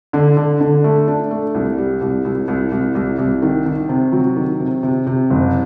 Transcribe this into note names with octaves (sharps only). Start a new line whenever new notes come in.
D3
D3
D3
A3
D4
A3
C2
G3
C2
C2
C2
C2
C2
C2
D#3
D#3
C3
F#3
D#3
C3
C3
C3
F#1